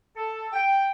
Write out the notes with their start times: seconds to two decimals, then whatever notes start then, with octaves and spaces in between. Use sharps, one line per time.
0.17 A4
0.53 G5